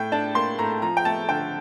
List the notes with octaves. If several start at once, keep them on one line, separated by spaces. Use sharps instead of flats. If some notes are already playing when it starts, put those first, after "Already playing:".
Already playing: A2 G5
D4 A5
A#3 C6
A2 A#5
F3 A#5
G5
A3 A5
D3 G5